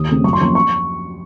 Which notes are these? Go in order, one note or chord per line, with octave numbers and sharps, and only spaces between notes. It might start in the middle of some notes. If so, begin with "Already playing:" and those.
Already playing: D#2 D#6
C#3 A3 C4
F#2 C#6
C6
F3 A#3 C#4 C#6
C#6